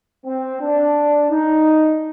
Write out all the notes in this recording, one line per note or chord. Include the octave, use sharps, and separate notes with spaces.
C4
D4
D#4